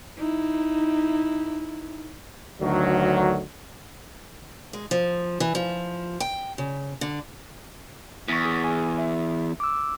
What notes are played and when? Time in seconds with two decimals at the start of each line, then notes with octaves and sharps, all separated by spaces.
0.17 D#4 E4
2.61 D2 D3 D#3 F#3
4.73 G#3
4.91 F3
5.40 E3
5.55 F3
6.20 G5
6.58 C#3
7.01 D3
8.28 E2 C#6 B6
8.45 G#4
8.64 G#5
8.98 E5
9.60 D6 E6